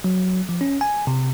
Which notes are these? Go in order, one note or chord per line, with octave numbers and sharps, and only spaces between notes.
F#3
F3
C#4
G#5
C3